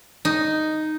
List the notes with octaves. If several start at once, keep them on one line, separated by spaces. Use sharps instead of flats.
D#4